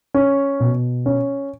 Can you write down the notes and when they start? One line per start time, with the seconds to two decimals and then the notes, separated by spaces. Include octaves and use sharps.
0.14 C#4
0.60 B2
1.06 C#4